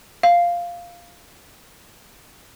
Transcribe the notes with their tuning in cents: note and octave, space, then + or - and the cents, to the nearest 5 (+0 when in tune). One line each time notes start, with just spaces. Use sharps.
F5 -5